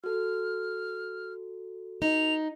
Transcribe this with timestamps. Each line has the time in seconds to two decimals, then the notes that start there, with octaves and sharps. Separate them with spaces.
0.04 F#4 A4 F6
2.02 D#4 F7